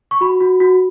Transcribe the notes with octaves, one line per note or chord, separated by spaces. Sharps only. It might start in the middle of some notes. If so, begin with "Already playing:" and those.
C#6
F#4 B5
F#4
F#4